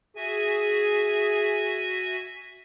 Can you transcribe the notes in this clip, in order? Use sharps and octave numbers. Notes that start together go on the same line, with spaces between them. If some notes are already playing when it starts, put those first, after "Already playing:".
F#4 G#4 E5 G#5